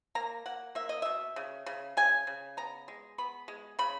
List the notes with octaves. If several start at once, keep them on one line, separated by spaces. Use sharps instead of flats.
A#3 A#5
A#3 F#5
A#3 E5
D#5
B2 E5
C#3
C#3
C#3 G#5
C#3
B3 A#5
G#3
B3 B5
G#3
C#3 B5